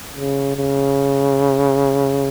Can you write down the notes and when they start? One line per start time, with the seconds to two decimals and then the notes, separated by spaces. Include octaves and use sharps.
0.17 C#3
0.57 C#3